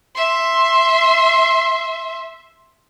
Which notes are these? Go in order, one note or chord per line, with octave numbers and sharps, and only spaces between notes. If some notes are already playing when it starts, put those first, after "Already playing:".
E5 C6